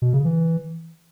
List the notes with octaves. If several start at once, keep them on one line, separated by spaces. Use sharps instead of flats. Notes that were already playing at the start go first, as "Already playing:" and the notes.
B2
C#3
E3